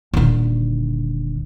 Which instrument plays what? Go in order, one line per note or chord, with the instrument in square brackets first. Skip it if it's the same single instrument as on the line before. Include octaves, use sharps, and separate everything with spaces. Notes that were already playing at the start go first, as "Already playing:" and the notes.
[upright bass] D#1 D3